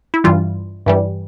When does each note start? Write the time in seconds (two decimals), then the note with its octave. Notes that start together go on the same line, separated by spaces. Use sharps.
0.14 E4
0.24 G2 E3 G3 F4
0.86 G2 E3 G3